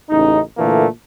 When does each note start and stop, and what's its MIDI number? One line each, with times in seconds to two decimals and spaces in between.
0.10 0.41 33
0.10 0.41 49
0.10 0.41 63
0.58 0.87 46
0.58 0.87 50
0.58 0.87 52
0.58 0.87 57
0.58 0.87 58